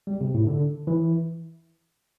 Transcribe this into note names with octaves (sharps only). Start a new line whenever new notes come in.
G3
C3
A2
D3
E3